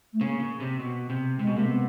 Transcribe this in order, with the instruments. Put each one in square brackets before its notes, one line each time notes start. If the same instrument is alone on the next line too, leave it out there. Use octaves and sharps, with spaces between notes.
[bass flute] A3
[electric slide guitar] C#3 [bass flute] A#3
[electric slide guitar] C#3
C3
B2
C3
[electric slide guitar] C3 [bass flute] G#3
[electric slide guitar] B2
[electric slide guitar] C3 [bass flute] A#3
[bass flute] B3